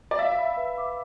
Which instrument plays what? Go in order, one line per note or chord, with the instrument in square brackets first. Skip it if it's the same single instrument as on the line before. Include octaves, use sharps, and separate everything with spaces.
[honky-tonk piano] D5
[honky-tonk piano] E5 [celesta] F5
[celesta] B5
B4
D6